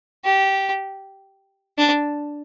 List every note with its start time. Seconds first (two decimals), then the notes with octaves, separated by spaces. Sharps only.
0.24 G4
1.78 D4